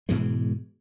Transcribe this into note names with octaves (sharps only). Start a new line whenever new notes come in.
G#2 B2 E3 G#3